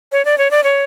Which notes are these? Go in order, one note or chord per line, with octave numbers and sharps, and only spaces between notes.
C#5
D5
C#5
D5
C#5